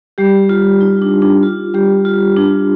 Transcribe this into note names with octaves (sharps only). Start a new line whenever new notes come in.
G3 G4
F4
D#4
D4
D4
F4
G3 G4
F4
D4